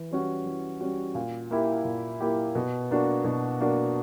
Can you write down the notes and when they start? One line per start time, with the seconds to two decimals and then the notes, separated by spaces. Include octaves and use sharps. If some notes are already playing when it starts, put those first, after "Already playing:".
Already playing: E3
0.11 G3 C#4 F#4
0.46 E3
0.81 G3 C#4 F#4
1.15 A#2
1.51 A#3 E4 G4
1.85 A#2
2.21 A#3 E4 G4
2.55 B2
2.91 A#3 D4 F#4
3.24 B2
3.61 A#3 D4 F#4